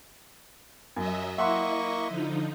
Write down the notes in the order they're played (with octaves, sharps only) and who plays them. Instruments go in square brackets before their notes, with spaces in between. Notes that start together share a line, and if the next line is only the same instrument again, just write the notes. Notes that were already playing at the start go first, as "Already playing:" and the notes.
[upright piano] F#2 [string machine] F#3 D#5 E5
[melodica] A#3 C#6 [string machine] E4 D#5 [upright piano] E5 F#5 C6
[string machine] D3 F3 D#4